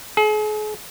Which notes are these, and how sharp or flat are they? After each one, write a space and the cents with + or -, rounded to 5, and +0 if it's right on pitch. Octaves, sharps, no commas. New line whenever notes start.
G#4 +40